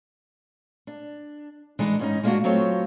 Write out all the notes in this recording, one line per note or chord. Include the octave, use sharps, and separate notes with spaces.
D4
E3 G#3 D4 D#4
G#2 C#4 D#4
G#3 A#3 D4 D#4 F4 F#4
F#3 A3 C4 F4 C#5